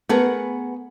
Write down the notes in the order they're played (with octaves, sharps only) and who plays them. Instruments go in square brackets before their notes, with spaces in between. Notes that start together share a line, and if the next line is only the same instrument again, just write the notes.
[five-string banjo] A3 A#4 B4 [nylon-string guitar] B3 G#4 F#5